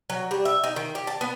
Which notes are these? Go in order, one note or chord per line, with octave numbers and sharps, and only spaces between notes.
F#3
G3
E5
D#4
D#3
G4
A5
B3